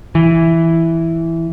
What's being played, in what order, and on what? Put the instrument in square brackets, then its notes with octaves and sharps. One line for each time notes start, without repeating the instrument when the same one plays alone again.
[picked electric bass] E3